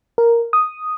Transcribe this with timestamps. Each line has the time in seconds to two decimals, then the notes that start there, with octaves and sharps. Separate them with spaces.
0.18 A#4
0.53 D#6